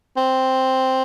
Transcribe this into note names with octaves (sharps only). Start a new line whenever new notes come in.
C4